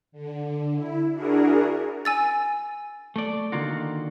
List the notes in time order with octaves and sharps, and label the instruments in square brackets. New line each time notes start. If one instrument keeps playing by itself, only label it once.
[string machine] D3
E4
D4 E4 F#4 G#4 A#4
[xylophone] G#5 E6 A6
[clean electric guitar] A3 D5
D3 D#3 A#3 F4 F#4